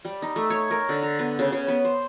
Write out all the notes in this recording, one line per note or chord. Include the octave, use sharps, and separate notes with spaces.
G3
D#4
A3
C#5
A#4
D3
A#5
B3
C#3
C#3
B3
C5